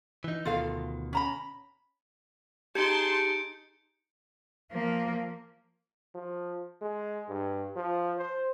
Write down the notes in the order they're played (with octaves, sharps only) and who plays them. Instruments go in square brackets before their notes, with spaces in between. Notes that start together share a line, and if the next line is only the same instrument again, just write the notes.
[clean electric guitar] E3 D#4
[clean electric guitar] D2 B2 D#3 [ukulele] F4 A4 F5
[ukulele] C#4 A#5 B5
[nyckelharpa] D#4 G#4 [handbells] G4 [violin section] A5 C6 [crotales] G6 C#7 D7
[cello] F3 A#3
[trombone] F3
G#3
G2
F3
C5